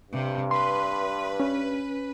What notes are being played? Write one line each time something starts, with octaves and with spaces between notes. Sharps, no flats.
G2 C3
B4 C6
C#4